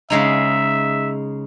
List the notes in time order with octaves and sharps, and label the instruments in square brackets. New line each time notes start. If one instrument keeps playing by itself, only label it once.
[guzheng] C#3 G#3 D#4 [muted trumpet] E5